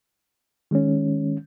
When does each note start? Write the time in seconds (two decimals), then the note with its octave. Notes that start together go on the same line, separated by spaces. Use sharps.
0.71 D#3 G#3 C#4